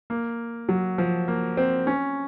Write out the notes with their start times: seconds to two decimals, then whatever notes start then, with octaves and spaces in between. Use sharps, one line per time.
0.10 A#3
0.69 F#3
0.98 F3
1.28 A#3
1.57 C4
1.87 C#4